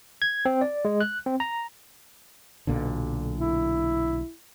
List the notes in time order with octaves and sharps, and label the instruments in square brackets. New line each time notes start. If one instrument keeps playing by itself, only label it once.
[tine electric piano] G#6
C4
D5
G#3
F#6
C4
A#5
[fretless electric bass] B1 A#2 D3
[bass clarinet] E4